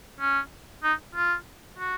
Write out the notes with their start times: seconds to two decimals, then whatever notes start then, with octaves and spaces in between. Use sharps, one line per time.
0.20 C#4
0.84 D#4
1.15 F4
1.79 F#4